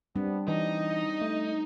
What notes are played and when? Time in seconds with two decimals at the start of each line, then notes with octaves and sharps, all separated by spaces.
0.16 G3 B3 C4 D4
0.48 E3 D#4 D#5
1.21 A3